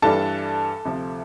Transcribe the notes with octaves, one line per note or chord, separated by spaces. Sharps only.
G2 E3 G3 D4 A4 A5
D2 C3 F3